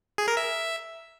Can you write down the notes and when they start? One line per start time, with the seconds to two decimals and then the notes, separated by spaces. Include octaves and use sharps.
0.18 G#4
0.28 A#4
0.37 E5